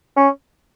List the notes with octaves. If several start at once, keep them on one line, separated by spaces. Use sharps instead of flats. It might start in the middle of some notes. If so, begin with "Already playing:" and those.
C#4